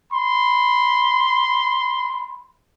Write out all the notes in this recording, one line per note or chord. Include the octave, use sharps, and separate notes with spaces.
B5 C6